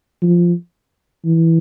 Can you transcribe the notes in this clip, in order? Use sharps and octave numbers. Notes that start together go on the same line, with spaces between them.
F3
E3